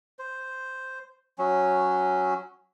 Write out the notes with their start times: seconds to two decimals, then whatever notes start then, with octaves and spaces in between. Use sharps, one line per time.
0.19 C5
1.38 F#3 C#4